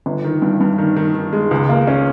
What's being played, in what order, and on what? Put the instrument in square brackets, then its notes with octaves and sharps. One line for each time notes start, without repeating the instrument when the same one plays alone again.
[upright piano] G1
D#3
G2
G2
D#3
D#3
D#3
G#3
C#2
A#3
C#4